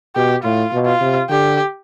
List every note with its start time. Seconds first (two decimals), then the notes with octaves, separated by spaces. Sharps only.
0.15 B2 G4
0.44 A2 F4
0.73 B2
0.86 F4
1.01 C3
1.30 D3 G4